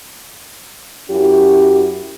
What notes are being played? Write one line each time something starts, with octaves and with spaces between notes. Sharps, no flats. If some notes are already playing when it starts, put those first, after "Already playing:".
F#2 C#4 E4 F#4 G4